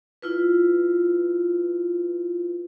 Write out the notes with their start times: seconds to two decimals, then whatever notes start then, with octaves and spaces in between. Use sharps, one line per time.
0.22 E4 F4 B4